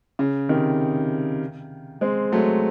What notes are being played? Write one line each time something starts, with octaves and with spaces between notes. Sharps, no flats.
C#3
C3 D#3
G#3 C4
F#3 A3